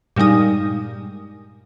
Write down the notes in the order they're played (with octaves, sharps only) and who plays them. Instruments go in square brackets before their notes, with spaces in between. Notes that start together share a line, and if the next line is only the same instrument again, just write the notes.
[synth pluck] G2 A#2 G3 G#3 D#4